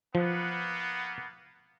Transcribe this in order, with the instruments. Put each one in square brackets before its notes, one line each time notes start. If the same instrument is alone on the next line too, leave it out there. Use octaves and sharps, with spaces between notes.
[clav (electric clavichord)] F3 [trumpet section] A#3 B3